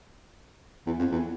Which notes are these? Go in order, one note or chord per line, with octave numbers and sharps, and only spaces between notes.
E2
F2
E2